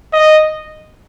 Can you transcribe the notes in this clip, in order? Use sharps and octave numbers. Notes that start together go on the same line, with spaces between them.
D#5